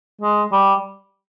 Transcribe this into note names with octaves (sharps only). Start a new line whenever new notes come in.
G#3
G3